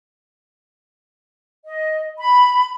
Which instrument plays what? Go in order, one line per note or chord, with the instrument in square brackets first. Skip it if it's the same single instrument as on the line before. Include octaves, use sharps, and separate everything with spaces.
[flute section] D#5
B5